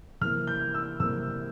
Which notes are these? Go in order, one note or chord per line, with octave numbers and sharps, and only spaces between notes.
C3 E3 A#3 F6
G6
E6
C3 E3 A#3 E6